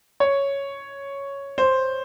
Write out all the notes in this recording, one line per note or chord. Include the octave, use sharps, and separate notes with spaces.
C#5
C5